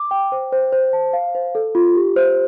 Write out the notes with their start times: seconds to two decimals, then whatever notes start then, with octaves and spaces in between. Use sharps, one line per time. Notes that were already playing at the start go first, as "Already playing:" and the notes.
Already playing: D6
0.11 G5
0.32 C5
0.52 C5
0.72 C5
0.93 A5
1.13 F5
1.35 C5
1.55 A4
1.75 F4
1.96 G4
2.16 C5